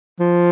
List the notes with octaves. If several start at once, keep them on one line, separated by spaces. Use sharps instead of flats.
F3